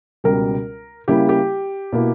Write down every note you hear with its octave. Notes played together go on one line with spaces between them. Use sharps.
C#2 B2 G3 A#4
C#3 G3 A#3 E4 G4
G4
B2 A#3 E4